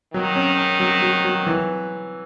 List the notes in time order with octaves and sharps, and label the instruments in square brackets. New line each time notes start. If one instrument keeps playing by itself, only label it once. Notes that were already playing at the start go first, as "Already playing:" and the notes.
[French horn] D#3 [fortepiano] F#3
[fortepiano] C#4
C#4
F#3
F#3
F#3
E3